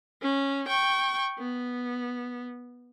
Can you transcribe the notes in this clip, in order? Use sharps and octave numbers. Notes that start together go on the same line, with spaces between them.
C#4
G5 C#6
B3